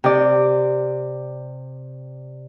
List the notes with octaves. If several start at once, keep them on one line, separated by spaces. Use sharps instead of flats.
C3 D5